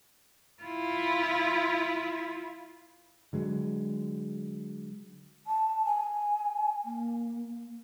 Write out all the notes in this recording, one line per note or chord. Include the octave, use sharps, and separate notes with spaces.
E4 F4
D3 F#3 G#3
A5
G#5
A#3